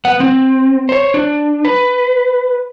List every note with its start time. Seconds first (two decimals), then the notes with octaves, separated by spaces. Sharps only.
0.05 B3 F#5
0.20 C4
0.89 C5 C#5
1.14 D4
1.65 B4